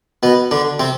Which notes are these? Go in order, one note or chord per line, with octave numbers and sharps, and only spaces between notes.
B2 B3
D3 D4
C3 C4